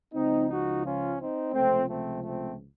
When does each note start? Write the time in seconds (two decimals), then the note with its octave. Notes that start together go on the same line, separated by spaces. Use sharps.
0.14 C#2 C#3 F3 C4 D#4
0.49 D#4 F#4
0.83 C#4 F4
1.18 C4 D#4
1.53 C#2 C3 F3 A3 C4
1.88 A3 C4
2.22 A3 C4